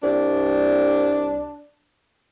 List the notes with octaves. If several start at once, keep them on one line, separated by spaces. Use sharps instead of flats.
C2 D4